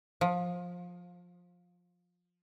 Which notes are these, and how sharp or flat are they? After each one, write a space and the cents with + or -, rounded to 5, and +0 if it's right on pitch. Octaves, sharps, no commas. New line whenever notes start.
F3 +20